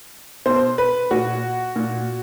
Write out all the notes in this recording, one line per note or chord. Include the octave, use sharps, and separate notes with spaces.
B2 C5
B4
A#2 F#4
A#2